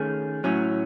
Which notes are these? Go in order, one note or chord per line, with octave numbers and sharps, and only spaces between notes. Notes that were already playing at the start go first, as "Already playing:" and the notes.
Already playing: D#3 A3 C#4 G#4
A2 F#3 C#4